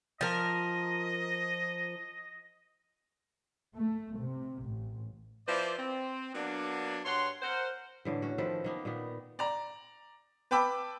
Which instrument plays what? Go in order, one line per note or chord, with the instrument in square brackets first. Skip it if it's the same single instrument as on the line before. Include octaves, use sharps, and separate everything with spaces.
[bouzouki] F3 A#4 [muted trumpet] D#5
[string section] A3
C3
A1
[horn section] F3 E4 B4 C5 D5
C4
F#3 A#3 B3 D4
G2 C#5 F#5 C6
A#4 C5 F#5
[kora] A2 D3 E3
C#4 F#4
D#3 F3 A4 B4
D#3 A#3 B3
A#2 D#3 B3
[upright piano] D5 A#5
B4 G5 A5 B5 D6 E6